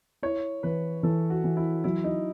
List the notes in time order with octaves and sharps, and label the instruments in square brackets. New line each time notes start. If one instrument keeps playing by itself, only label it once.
[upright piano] E4 [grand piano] C#5
[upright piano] E3 [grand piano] B4
[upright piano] E3 [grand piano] A4
[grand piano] F#4
[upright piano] E3
[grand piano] E4
[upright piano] F#3 [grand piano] E4
[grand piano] D#4